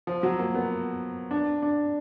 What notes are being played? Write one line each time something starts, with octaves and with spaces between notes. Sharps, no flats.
F3
F#3
A#3
B3
D4
D4